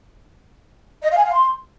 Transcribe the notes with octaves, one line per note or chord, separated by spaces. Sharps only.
D#5
F5
G#5
F5
C6